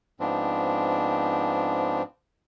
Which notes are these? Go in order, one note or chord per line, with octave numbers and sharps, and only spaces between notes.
G#2 F3 B3 C4 D4